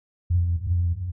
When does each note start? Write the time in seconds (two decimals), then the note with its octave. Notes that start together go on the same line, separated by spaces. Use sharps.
0.30 F2
0.66 F2